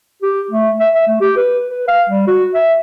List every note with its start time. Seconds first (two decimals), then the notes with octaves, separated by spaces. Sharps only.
0.22 G4
0.51 A3
0.80 E5
0.94 E5
1.07 A3
1.21 G4
1.36 B4
1.68 B4
1.88 F5
2.09 G3
2.27 F#4
2.54 E5